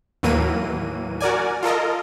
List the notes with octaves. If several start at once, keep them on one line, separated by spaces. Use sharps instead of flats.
D#2 A2 E3 F#3 A#3 D#7
F#4 A#4 D5 G#5
F4 A4 A#4 D#5